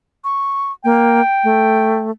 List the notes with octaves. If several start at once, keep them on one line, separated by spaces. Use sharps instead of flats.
C#6
A#3 G5
A3